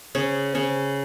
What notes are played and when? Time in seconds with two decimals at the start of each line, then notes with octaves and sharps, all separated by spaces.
0.15 C#3 C#5
0.55 C#3 C#5